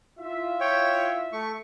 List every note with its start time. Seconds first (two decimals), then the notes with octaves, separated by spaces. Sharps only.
0.19 E4 F4 E5
0.61 C#5 G5
1.33 A3 C#6